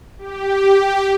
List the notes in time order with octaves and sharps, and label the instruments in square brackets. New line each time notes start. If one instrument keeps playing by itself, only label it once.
[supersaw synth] G4